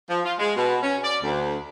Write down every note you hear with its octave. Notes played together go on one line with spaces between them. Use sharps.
F3
F4
G#3
B2
C#4
D5
D2